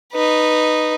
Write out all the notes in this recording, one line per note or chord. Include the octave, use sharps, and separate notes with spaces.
D#4 B4